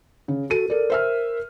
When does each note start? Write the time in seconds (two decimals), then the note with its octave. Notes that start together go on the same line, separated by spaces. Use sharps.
0.28 C#3
0.50 F#4 A4 D#7
0.70 A4 A#4 D5
0.90 C5 E5 F6